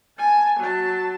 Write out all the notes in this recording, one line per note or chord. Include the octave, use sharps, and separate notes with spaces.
G#5 A5
F#3 A5